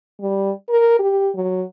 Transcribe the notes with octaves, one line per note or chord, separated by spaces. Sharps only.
G3
A#4
G4
F#3